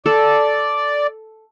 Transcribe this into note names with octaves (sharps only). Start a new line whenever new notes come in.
A4 D5